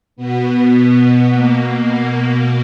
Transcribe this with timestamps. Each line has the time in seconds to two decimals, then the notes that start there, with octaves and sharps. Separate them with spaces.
0.16 B2 B3
0.46 B3
1.03 B3
1.32 B2 A#3
1.90 A#3
2.18 A#3